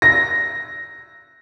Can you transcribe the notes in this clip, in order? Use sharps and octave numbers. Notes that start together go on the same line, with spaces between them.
A#6